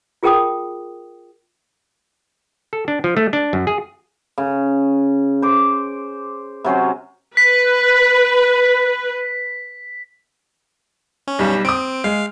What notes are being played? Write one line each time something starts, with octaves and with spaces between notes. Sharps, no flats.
F4 G#4 A#4 G5 D6 D#6
A4
D4
F3
A3
D4
F#2
G#4
C#3
C5 D6
C3 F#3 C#4 C5
B4 B6
C#4
B1 G3
C4 D#6 D7
G#3 F5